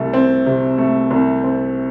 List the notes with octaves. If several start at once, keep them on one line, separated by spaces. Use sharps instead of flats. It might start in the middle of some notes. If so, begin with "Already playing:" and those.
Already playing: C2 C3 A3
C4
C3
A3
C2
C4